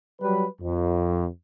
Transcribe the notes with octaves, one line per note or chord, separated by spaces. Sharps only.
F#3 G3 B4
F2